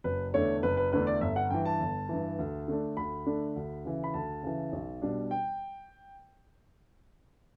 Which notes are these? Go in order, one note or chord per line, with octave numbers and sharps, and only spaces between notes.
F#1 B4
E2 D3 A3 D4 C#5
F#1 B4
B4
E2 D3 A3 D4 B4
D5
G1 E5
F#5
G2 E3 G5
A5
G1
G2 E3
D2
D3 A3 D4
D2 B5
D3 A3 D4
D2
C#3 E3
B5
D2 A5
C#3 E3
B1
B2 G3 D4
G5